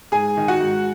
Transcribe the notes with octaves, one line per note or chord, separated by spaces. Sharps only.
G#2 G#4 G#5
D#3
F#4 F#5
G#2